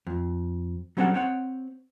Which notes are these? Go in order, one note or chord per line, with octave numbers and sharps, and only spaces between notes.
F2
F#3 G3 C4 C#4 A4 F#5
C4 C#5 F#5